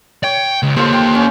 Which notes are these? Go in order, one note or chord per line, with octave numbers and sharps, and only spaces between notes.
C#5 G5
C#2
A#3 F4 G4 A4 C5
G5
C#4